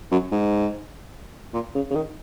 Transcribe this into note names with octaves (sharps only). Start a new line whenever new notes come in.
F#2
G#2
A#2
C#3
C#3
D#3